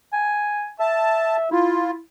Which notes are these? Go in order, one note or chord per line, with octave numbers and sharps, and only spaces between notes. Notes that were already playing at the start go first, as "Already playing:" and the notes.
G#5
E5 A5
E4 F4